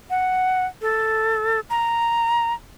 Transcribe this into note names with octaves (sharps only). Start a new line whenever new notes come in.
F#5
A4
A#5